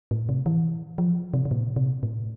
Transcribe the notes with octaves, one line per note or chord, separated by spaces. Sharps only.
A2
C3
E3
F3
C3
C3
A#2
C3
A2